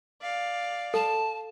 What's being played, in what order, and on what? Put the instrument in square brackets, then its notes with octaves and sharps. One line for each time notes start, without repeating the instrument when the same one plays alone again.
[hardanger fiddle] D5 F5
[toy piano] A4 [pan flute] A5